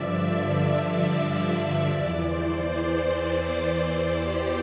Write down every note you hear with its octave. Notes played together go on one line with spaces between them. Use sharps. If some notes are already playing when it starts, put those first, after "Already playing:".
Already playing: G2 D3 F3 D5 E5
D5
E2 E3 D5
C5
G4